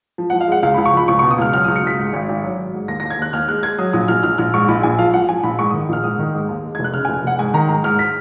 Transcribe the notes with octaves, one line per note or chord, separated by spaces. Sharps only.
F3
F#5
F3
F5
G#3 F#5
C#2 F5
B5
C#2
C#6
F3 B5
C#2 C#6
C#6
B2
D#6
C#2 F6
F#3 F6
D#6
C#2
C#7
C#2 B6
G#2
G#1
G#1
F#3
G#1
G#2
D#2 A#6
A#6
D#2
G#6
D#2 F#6
D#2 F6
G#3 F#6
G#3 G#6
F#3 D#6
A#1 D#6
A#1 F6
A#1 F6
A#1 F6
G#2 C#6
A#1 B5
A#1 G#5
F3 F5
F3 F#5
F3 G#5
A#1 B5
G#2 C#6
D#6
D#3
A#1 F6
G#2 D#6
D#3
G#2
D#2
G#3
F1 G#6
F#6
C#3 F6
G#5
F1
F1 F#5
G#2 G#5
D#3 A#5
G#2 A#5
G#2 F6
B6